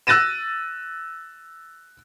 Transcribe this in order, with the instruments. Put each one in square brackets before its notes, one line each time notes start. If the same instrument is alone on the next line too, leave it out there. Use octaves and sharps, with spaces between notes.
[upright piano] E6 F#6 A6 A#6 D#7 E7